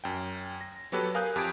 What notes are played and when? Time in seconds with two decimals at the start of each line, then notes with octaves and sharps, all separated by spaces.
0.04 F#2 G5
0.61 A#6
0.92 F#3 B3 G4 A4 B4 C#5
1.14 A#4 F5 G#5 D#6 F#6 G6
1.36 F2 G4 A5 D#6 G#6 D7